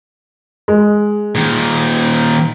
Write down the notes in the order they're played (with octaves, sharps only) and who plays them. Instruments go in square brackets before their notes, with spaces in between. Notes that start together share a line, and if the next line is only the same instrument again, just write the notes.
[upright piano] G#3
[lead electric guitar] A#2 D#3